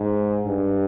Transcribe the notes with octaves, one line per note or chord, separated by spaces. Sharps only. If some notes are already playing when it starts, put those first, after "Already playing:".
Already playing: G#2
G2